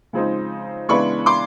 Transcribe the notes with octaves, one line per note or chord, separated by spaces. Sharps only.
C#3 F3 G#3 C4 D#4
C#3 E3 G#3 B3 D4 B5 C#6
C6 D6